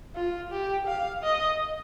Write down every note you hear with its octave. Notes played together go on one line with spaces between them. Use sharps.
F4
G4
F5
D#5